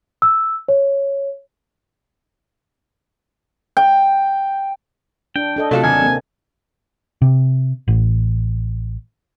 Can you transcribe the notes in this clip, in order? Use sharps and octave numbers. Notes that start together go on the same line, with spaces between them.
E6
C#5
G5
D4 G5
D4 A4 D#5
C3 F#3 A3 D4 F4 F#4 A4
D#2 G#5
A#3 C4
C3
A1